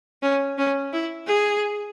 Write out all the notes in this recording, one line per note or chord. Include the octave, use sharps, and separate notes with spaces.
C#4
C#4
E4
G#4